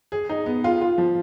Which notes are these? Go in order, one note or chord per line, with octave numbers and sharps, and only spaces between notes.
G#4
D#4
B3
F4
F4
F3